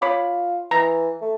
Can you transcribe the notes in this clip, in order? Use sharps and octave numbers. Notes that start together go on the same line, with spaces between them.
F4 C#5 B5 D6
E3 A#5
A3